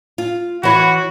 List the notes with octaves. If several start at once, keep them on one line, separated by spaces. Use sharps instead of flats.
F4
E3 F#4 C#5 F#5 B5